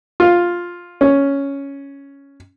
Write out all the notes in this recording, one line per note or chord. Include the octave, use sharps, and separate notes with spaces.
F4
C#4